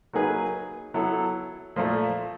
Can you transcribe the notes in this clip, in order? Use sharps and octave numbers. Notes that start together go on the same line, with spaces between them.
F#3 A#3 D#4 G#4 B4
F#3 B3 E4 A4
A#2 F3 A3